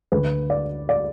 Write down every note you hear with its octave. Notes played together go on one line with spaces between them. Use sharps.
D2 D3 B4
D5
D5